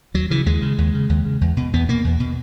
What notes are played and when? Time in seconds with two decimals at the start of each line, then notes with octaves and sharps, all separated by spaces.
0.14 D#2 F#3
0.30 C#3 E3
0.46 D#2 G#3
0.62 C#3
0.78 D#2
0.94 C#3
1.09 D#2
1.25 C#3
1.41 E2
1.57 B2
1.73 E2 B3
1.89 B2 A#3
2.04 E2
2.20 B2